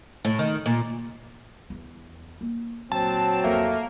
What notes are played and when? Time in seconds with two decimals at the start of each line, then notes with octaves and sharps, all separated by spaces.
0.25 A2
0.39 D#3
0.66 A#2
1.70 E2
2.41 A#3
2.92 A#2 F#3 C4 A5
3.44 A#1 F2 A3 A#3